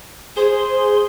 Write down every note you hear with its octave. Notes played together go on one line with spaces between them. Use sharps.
G#4 C5 C6